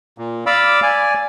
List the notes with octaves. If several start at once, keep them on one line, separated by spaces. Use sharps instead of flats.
A#2
D5 F5 B5 D6 E6
D5 G#5